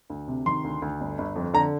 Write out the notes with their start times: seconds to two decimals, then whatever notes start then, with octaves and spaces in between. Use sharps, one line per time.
0.10 D2
0.28 C3
0.46 D#3 C6
0.64 D2
0.82 D2
1.01 G1
1.18 G1
1.36 F2
1.54 D3 A#5